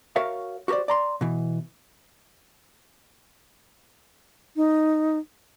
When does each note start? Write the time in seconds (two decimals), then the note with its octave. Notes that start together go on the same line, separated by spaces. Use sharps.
0.16 F#4 A#4 C#5 E5 F5
0.68 F#4 G4 A#4 C5 D5
0.88 D5 A#5 C6
1.21 B2 E3
4.56 D#4